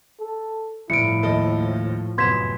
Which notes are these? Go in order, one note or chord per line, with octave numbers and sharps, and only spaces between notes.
A4
G1 A2 F3 E4 C#7 D7
D#2 A4 D#5
F1 F#2 B3 C6 G#6 B6 E7